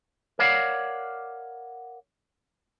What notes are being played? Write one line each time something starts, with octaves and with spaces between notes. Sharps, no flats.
A#4 C#5 D5 F5 F#5